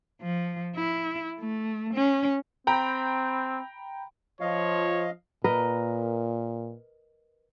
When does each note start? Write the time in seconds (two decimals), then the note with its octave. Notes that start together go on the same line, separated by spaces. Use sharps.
0.22 F3
0.76 E4
1.40 A3
1.94 C#4
2.67 C4 G5 A#5 B5
4.41 F3 C#5 D#5 F5
5.44 A#2 A#4 B4 D#5